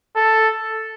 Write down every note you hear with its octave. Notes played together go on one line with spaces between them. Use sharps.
A4